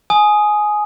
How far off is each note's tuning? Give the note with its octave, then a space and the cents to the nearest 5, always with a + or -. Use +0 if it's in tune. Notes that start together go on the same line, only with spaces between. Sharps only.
G#5 +15 D#6 +0